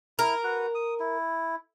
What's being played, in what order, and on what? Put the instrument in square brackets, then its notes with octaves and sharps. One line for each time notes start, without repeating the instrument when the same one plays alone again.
[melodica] E4 [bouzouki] A#4
[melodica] F#4 B4
D#6
E4